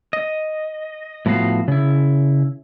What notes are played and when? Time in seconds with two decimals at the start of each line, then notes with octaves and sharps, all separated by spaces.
0.13 D#5
1.26 A2 F3 B3 F#4 F5
1.68 C#3 E4